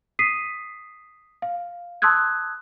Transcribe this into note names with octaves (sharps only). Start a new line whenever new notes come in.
D#6 B6 C7 D#7
F5
A5 C6 D#6 E6 F#6 G#6